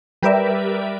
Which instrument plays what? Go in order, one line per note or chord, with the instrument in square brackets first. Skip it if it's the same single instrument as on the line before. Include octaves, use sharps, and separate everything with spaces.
[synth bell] G3 G4 A#4 B4 D5 E5